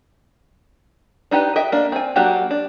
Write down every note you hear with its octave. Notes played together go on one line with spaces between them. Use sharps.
D4 D#4 G4 B4
D#5 E5 G5
A#3 D4
C4 G#5
F#3 A#3 D4 F#4 G4
D4